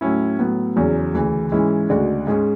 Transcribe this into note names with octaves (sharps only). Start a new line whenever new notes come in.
A2 F#3 C#4 E4
A2 F#3 B3
E2 C#3 F#3 C#4
D2 C#3 E3
G#2 E3 G#3 C#4 E4
D2 C#3 G#3 D4 F#4
G#2 G#3 C#4 G#4